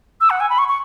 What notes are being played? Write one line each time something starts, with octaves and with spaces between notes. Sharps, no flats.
E6
F#5
G#5
B5
C#6
C#6